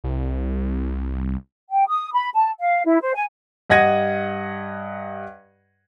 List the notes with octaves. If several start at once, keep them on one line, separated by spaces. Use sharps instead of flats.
C2
G5
D#6
B5
A5
F5
E4
C5
G#5
G2 D#5 F#5 G#6 A#6 D#7